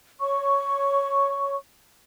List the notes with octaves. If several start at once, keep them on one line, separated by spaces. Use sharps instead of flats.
C#5 C#6